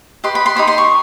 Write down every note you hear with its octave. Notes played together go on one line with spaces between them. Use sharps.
G4 B4 D#5 C6
B5
C6
D#4 G4 C5 B5
C6
C#6